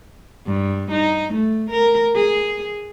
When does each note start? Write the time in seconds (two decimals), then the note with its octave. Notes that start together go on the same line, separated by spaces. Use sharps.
0.46 G2
0.91 D#4
1.33 A3
1.70 A#4
2.16 G#4